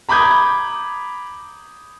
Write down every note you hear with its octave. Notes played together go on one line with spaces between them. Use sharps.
A#5 B5 D6 D#6 G6 G#6